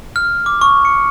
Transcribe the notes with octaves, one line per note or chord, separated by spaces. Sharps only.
F6
D6
C#6
C#7